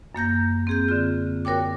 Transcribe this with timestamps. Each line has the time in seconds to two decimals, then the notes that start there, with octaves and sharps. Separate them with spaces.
0.15 F#2 A#3 G6 A#6
0.67 C4 G#4 G6
0.88 D3 C4 F4
1.45 F#4 A#4 C#5 G5 D6